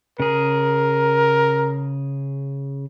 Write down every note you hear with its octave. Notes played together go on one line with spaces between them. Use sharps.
C#3 G#4 A#4